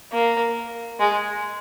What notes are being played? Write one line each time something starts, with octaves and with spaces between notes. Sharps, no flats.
A#3
G#3